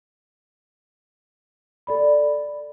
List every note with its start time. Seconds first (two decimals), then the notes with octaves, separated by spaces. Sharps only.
1.87 A4 D5 B5